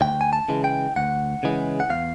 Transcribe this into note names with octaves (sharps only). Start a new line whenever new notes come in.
D2 G5
G#5
A5
C#3 E3 G#3
G5
D2 F#5
C#3 E3 G#3
F#5
E2 F5